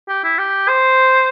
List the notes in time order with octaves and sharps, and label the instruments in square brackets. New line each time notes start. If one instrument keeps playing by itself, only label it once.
[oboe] G4
E4
G4
C5